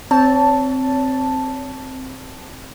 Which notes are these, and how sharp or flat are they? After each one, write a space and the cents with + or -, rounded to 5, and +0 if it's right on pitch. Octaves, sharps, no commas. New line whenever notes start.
C4 +0 C#5 +35 A5 +0